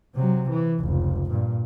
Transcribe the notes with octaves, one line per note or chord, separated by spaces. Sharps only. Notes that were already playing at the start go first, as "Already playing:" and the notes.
C3 F#3
E3
F1 C#2
G2 A#2